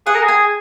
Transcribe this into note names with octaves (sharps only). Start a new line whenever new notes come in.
G#4 F#5
A#4
G#4
G#5